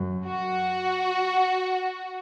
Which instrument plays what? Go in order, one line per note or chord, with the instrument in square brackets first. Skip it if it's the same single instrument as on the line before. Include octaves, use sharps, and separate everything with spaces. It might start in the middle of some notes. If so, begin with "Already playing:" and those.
Already playing: [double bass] F#2
[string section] F#4